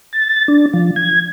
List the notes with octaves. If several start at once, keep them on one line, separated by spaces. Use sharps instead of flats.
A6
D4
F3
G#6